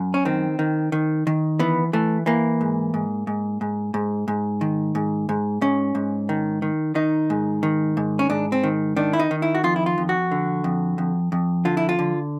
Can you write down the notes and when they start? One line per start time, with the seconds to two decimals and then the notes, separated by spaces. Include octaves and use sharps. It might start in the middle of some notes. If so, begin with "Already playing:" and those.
Already playing: F#2
0.14 C#4
0.25 D#3 C4
0.59 D#3
0.92 D#3
1.27 D#3
1.59 E3 B3
1.93 E3 A3
2.26 E3 A#3
2.61 G#2
2.94 G#2
3.27 G#2
3.61 G#2
3.94 G#2
4.28 G#2
4.61 D#3
4.95 G#2
5.29 G#2
5.61 G#2 C#4
5.95 G#2
6.29 D#3
6.62 D#3
6.95 D#3 D#4
7.30 G#2
7.63 D#3
7.97 G#2
8.19 C#4
8.30 G#2 D4
8.52 C4
8.63 D#3
8.96 D#3 D4
9.13 E4
9.19 D#4
9.31 D#3
9.42 E4
9.55 F#4
9.64 F2 F4
9.76 E4
9.86 F4
9.98 F2
10.09 F#4
10.31 D3
10.64 F2
10.98 F2
11.32 F2
11.65 D3 F4
11.77 E4
11.89 F4
11.99 D3